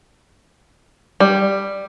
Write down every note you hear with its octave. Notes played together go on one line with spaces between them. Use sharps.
G3